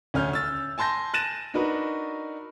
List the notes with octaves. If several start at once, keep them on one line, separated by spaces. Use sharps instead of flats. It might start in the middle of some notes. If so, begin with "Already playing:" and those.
D2 C#4 F6 G6
E6 A6
G#5 A5 C6 G6 A#6
F#6 A6 A#6 D#7 E7
D4 D#4 F#4 A#4 B4